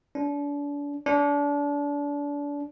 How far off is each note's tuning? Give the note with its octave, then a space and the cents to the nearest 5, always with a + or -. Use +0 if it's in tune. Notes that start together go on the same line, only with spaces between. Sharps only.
D4 -35
D4 -30